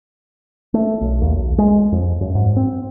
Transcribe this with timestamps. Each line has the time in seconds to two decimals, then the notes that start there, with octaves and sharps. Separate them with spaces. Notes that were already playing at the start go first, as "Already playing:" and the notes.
0.74 A3
1.01 B1
1.22 D#2
1.36 B1
1.58 G#3
1.92 F2
2.21 F#2
2.35 G#2
2.56 C4